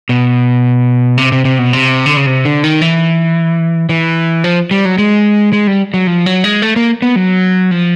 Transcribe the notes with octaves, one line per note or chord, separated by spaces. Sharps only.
B2
C3
C3
C3
B2
C3
D3
C#3
C3
D3
D#3
E3
E3
F3
G3
F#3
G#3
G#3
G3
F#3
F3
F#3
G#3
A3
A#3
B3
F#3
F3